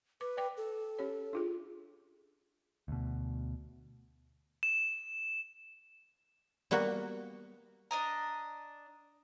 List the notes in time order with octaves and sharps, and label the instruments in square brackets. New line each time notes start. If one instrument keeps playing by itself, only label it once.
[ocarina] B4 [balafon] D6
[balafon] D5 G5 D6
[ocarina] A4
[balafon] C#4 G4 C#5
D4 F4 G#4
[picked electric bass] D2 B2
[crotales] E7
[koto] G3 A#3 B3 F#4
[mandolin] D4 D#5 A#5